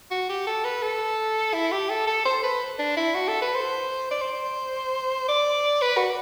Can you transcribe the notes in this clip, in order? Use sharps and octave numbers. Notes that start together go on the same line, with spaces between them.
F#4
G4
A4
B4
A4
E4
G4
A4
A4
C5
B4
D4
E4
F#4
A4
B4
C5
D5
C5
D5
B4
F#4